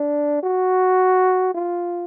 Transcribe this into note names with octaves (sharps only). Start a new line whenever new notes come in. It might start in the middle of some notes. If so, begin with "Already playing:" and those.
Already playing: D4
F#4
F4